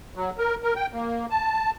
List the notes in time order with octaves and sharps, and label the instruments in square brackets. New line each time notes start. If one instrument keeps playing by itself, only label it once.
[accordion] F#3
A#4
A#4
G5
A#3
A5